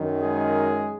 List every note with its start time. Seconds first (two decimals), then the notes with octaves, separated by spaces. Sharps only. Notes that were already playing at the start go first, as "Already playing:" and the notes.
Already playing: F#2 D#3
0.22 G#3 G#4